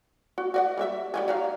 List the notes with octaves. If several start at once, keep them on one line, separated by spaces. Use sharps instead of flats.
F#4
F#4 D5 F#5
G3 A#4 E5
G3 G#3 G#4
F#3 D#4 F5